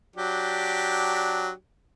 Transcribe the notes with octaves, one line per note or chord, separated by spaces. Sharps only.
F#3 D4 G4